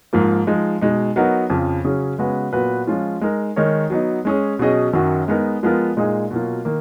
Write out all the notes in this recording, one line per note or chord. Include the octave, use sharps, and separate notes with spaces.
G#2 F3 A#3
F3 G#3 D#4
B2 G#3 D#4
F#3 B3 D#4 F#4 A#4
F2 C#3 F3
C#3 F#3 C#4 G#4
C#3 G#3 B3 F#4 B4
A#2 F#3 B3 F#4 B4
F3 G#3 C#4 F4
G#3 D#4 A#4
D#3 G#3 D#4 A#4 C#5
F#3 B3 D#4
G#3 C#4 G#4
B2 F#3 C#4 G#4 D#5
F#2 D#3 F#3 C#4 F#4
G#3 B3 D#4 A#4
F3 G#3 B3 F4 A#4
A#2 G#3 D#4 G#4
B2 F#3 A#3 F4
D#3 A#3